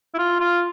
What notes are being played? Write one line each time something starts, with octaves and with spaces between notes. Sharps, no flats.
E4
F4
F4